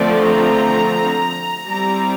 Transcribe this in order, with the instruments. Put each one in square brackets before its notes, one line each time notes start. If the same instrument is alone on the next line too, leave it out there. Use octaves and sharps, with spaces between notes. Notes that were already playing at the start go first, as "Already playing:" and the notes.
Already playing: [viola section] D3 F3 A3 C4 D5
A#5
G3 C4 E4 A#5